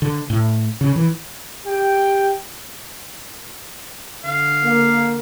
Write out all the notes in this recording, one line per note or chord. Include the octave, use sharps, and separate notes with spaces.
D3
A2
C#3
E3
G4 G5
D3 F5
A#3